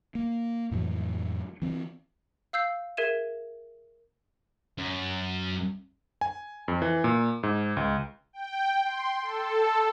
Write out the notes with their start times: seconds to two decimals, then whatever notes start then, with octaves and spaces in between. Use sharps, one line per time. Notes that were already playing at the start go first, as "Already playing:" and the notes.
0.15 A#3
0.71 F2 A2 E3 F#3
1.62 E3 C4
2.53 F5 E6 G6 C7
2.97 G#4 A#4 E5 G#6 D#7 E7
4.78 F#2
6.21 G#5
6.68 F2
6.82 E3
7.04 A#2
7.43 G#2
7.77 C#2
8.33 G5
8.84 C6
9.23 A4